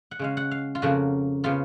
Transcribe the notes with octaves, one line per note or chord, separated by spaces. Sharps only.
F#5
C#3 G#3 C#4 F5
F#5
F5
F4
F2 C#3 F3 A#3 F#4
C#3 F3 B3 F4